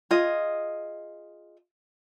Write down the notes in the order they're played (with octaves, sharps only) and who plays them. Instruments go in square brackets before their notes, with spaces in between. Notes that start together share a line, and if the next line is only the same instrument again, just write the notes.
[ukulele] F4 G#4 D#5